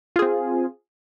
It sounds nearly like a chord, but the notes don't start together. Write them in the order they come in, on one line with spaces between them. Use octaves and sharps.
F4 G#4 C4